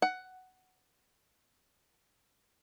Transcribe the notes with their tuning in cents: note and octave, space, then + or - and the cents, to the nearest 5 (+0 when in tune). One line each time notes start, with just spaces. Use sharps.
F#5 +10